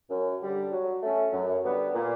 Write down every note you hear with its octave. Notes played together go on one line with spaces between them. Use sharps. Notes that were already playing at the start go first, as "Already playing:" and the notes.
F#2
D3 G3
F#3
A3 C#4
F#2
D3 G3 B3
A#2